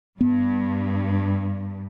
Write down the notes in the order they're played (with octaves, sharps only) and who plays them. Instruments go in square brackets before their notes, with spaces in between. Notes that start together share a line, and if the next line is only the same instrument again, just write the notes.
[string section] G2 [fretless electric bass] B3